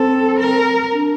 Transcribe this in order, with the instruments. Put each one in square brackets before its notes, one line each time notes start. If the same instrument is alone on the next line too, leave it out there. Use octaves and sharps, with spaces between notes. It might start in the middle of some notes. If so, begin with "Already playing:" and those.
Already playing: [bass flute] C4 [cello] A4
[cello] A#4
[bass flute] D4